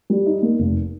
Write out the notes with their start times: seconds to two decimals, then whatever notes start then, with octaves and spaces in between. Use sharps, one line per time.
0.10 G3
0.26 D#4
0.42 A#3
0.59 F1